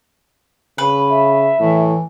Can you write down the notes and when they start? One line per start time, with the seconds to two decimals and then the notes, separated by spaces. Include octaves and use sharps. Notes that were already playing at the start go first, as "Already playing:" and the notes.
0.78 C#3 B4
1.10 E5
1.60 A2 E3